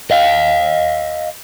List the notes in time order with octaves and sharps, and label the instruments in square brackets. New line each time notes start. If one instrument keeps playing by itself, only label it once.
[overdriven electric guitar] D#5 F5